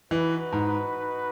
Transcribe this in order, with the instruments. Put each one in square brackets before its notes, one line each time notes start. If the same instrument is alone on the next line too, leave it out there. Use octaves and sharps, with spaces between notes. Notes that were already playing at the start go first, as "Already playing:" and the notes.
[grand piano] E3 [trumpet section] D#4 F#4 B4
[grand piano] G#2